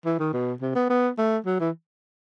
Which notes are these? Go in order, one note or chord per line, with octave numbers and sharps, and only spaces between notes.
E3
D#3
B2
C3
B3
B3
A3
F#3
E3